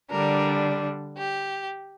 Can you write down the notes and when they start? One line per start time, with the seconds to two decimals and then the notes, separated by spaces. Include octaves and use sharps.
0.10 D3 G3 D4 A#4
1.17 G4